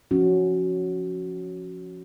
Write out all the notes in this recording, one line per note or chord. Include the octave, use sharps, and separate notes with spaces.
F3 C#4 F#4